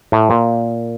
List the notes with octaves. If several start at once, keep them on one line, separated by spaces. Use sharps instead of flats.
A2
A#2